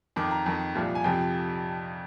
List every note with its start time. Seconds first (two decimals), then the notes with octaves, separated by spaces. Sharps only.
0.16 F2 D#3 D6
0.31 A#5
0.46 F2 D#3
0.75 C2 A#2 F3
0.95 G#5
1.04 F2 C3 F3 G5